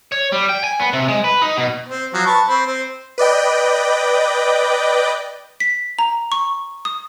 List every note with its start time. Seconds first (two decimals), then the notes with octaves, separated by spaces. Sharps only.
0.12 C#5
0.32 G3
0.49 G5
0.64 G#5
0.80 B3
0.93 C3
1.08 G#3
1.24 B4
1.42 D#4
1.57 B2
1.89 C4
2.14 F3 F#3
2.26 B4 A5 C#6
2.48 C4 B5
2.67 C4
3.18 B4 D5 D#5 G5
5.60 B6
5.99 A#5
6.32 C#6
6.85 D#6